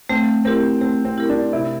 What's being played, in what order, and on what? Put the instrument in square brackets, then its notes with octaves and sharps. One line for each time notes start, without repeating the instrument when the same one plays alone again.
[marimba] A3 [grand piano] C4
[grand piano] C4 [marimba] E4 G4 A#4
[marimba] A3 [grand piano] C4
[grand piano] C4
[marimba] E4 G4 A#4
[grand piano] D4
[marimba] C3 [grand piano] E4